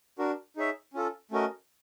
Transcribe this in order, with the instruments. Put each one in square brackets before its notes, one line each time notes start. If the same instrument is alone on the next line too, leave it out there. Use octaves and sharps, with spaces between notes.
[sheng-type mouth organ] D4 F#4 A#4
D#4 G#4 C#5 E5
C#4 F4 A4
A3 C#4 F#4 A#4 D#5